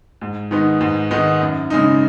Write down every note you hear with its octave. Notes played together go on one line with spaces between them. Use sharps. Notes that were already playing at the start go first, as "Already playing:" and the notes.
G#2
D#3 G#3 B3 D#4
G#2
D#3 G#3 B3 D#4
F#2
C#3 G#3 D#4